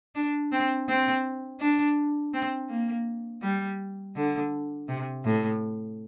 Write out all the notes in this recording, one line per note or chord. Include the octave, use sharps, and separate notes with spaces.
D4
C4
C4
D4
C4
A#3
G3
D3
C3
A2